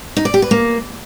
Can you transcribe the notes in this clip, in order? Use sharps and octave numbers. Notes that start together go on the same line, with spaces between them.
D#4
D5
G4
B4
A#3